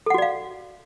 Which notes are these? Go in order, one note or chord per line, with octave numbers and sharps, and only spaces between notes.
F#4 A4 D5 F5 F#5